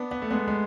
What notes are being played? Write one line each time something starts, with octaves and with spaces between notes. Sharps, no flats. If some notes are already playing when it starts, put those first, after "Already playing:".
Already playing: B3 D4
B3
A3
G#3 B3
G#3